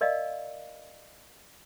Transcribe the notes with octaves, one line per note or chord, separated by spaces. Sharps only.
A#4 D5 D#5 F5